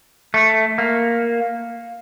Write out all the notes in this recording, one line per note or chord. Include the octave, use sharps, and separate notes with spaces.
A3
A#3